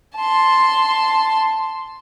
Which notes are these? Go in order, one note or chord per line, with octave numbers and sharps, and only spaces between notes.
A5 C6